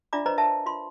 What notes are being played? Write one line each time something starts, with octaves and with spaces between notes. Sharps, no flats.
D4 F4 D5 E5 A#5 D6
B4 C5 D#5 A#5
A#4 E5 A5
F4 C6